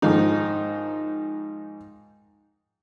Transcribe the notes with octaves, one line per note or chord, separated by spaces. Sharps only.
G#2 D#3 F3 D#4